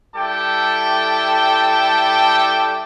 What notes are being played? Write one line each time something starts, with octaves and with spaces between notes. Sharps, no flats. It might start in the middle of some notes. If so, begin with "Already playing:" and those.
G3 E4 A4 G5 A5 D6